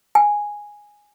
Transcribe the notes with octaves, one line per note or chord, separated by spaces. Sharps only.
G#5